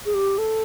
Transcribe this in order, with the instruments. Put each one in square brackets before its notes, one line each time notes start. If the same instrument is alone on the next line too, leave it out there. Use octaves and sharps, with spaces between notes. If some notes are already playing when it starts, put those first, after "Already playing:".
[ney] G#4
G4
A4